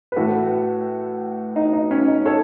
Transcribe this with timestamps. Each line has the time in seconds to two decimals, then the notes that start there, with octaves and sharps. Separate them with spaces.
0.12 B4
0.16 A2 E3 F#4 A4
1.56 D#4
1.73 D#4
1.91 C#4
2.08 D#4
2.25 A4 C#5